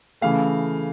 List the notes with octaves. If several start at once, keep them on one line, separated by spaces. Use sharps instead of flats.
C#3 E3 A3 F5